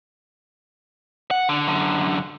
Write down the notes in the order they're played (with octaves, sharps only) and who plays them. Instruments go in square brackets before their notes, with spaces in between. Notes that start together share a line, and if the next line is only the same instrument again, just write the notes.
[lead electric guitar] F#5
D3
F#2 D3